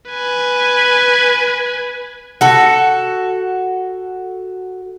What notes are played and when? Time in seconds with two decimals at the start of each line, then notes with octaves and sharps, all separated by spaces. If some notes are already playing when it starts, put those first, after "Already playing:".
0.10 B4 G#5
2.41 F#4 A4